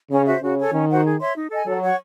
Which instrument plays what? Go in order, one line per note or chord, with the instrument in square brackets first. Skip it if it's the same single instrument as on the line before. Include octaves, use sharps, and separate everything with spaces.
[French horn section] C#3 [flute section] C#4
[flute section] F#4 C5 E5
[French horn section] C#3 [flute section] F#4
[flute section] A4 C#5 G#5
[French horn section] D#3 [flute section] C#4
[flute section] F#4 C5 F#5
G#4
C#5 E5 C6
D#4
A4 D#5 G#5
[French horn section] F#3 [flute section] A4
[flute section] C#5 F#5 C#6